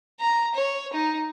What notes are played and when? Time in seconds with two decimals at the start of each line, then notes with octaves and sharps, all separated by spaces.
0.20 A#5
0.54 C#5
0.93 D#4